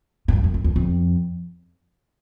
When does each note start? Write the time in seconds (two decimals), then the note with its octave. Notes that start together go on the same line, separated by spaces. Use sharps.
0.28 G#2
0.33 G2
0.44 F#2
0.54 F2
0.64 E2
0.76 F2